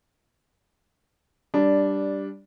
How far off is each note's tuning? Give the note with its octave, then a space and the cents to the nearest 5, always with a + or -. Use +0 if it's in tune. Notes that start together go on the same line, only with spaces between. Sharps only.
G3 +0 D4 -5